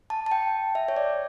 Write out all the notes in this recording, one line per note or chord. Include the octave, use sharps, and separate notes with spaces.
A5
A5
G5
E5
C#5
D5